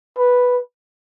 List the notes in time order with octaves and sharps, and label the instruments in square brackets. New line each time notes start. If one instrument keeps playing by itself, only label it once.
[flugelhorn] B4